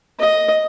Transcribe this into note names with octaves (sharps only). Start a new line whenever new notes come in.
D#5